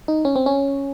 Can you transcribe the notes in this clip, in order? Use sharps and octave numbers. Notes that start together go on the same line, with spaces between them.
D#4
C#4
C4
C#4